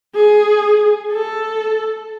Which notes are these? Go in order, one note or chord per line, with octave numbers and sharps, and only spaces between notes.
G#4
A4